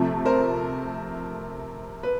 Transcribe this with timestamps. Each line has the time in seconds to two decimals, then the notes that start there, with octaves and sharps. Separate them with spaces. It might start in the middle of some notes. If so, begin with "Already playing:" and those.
Already playing: C3 F3 A3
0.25 A#4 C5
2.03 B4